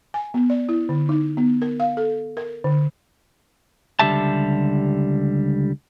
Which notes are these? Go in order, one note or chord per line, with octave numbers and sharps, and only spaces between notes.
G#5
B3
D5
E4
D3
D#4
B3
A#4
F5
A4
A#4
D3
C#2 D3 G3 G4 E5 A5